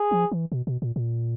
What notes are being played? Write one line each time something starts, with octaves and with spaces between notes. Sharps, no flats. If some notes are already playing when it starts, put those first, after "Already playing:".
Already playing: G#4
F3
E3
B2
B2
A#2
A#2